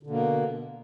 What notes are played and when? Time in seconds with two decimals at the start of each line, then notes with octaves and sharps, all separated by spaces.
0.03 D3
0.07 B2
0.10 A#3